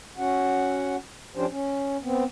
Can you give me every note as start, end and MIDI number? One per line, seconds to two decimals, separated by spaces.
0.18 0.96 61
0.18 0.96 66
0.18 0.96 78
1.36 1.46 53
1.36 1.46 61
1.36 1.46 62
1.36 1.46 67
1.36 1.46 72
1.50 1.97 61
2.03 2.24 59
2.03 2.24 60